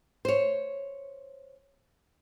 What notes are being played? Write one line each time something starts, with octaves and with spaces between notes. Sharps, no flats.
C5 C#5